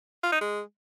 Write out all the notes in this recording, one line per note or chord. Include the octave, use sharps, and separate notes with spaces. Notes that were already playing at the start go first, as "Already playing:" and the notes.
F4
D#4
G#3